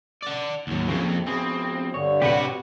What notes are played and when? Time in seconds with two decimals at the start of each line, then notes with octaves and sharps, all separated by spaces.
0.22 D5 F#5
0.67 D#2 F#3
0.88 F2 A#2 C#3 C4
1.27 F2 B2 C4 G#4
1.94 G2 D3 C#5
2.22 C3 F#4 G4 B4 F#5